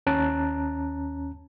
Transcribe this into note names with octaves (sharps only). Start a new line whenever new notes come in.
D#2 C#4 A5 A#5 F#6